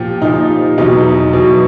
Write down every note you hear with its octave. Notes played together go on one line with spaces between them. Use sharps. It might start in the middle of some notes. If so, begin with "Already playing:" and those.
Already playing: A#2 F3 G4
A#2 F3 D#4
E2 B2 F#3 D#4
E2 B2 F#3